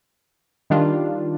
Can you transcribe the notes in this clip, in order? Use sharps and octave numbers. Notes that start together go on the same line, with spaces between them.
D#3 G3 D4 F4